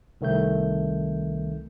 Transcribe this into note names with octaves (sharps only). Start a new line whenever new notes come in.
C2 D#3 A3 G6